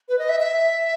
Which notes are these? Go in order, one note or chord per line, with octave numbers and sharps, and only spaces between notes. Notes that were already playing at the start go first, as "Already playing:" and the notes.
B4
D#5
E5
E5